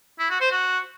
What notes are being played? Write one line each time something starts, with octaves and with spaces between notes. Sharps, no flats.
E4
F#4
C5
F#4